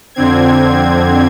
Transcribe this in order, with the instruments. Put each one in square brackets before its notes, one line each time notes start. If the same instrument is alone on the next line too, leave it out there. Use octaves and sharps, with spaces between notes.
[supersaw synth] F2 D3 C4 G#6